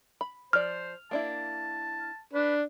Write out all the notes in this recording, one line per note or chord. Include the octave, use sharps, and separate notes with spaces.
B5
F3 C5 D5 F6
A#3 D4 E4 A5
D4 B4